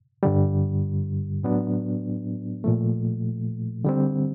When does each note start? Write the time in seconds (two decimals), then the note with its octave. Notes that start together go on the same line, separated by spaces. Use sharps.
0.23 G2 D3 G3
1.43 A2 F#3 B3 D4
2.64 A#2 F3 A3
3.84 D3 G3 C4